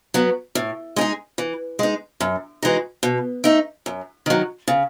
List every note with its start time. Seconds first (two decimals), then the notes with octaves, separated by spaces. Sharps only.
0.14 F#3 B3
0.55 A2
0.96 G#3 D#4 G#4
1.38 E3
1.79 G#3 D#4
2.20 F#2
2.62 E3 G#3 D#4 F#4
3.03 B2
3.44 A3 D#4
3.86 F#2
4.26 D#3 F#3
4.68 C#3